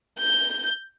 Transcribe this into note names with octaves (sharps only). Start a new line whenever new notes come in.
G6